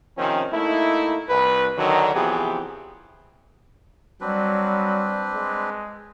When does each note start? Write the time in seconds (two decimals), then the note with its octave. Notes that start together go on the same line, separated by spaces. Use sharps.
0.17 C3 D#3 F3 C4 C#4
0.52 A3 A#3 D#4 E4
1.29 C2 B4
1.77 D3 D#3 F#3
2.14 C3 E3 F3 B3 G4 G#4
4.21 F#3 G3 C4 D4 B4
5.34 G#3